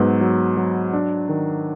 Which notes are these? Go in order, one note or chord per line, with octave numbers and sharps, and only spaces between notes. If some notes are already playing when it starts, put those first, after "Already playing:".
Already playing: G#2 F#3 B3 B4
F#3
F#3
D4
D#3